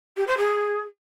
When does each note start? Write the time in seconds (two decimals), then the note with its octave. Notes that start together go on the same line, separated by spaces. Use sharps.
0.16 G4
0.27 C5
0.37 G#4